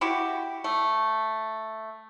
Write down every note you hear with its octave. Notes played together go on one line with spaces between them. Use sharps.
E4 F#4 G4
A3